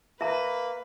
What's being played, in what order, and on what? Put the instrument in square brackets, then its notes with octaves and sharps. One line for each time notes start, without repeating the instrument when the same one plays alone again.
[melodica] A#3 [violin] B4 [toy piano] E5 A#5